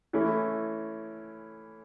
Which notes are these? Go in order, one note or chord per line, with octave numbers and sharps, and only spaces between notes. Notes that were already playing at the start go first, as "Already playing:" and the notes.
E3 A3 C#4 E4